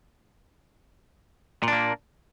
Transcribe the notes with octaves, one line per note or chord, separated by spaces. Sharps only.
A#2 A#3 D4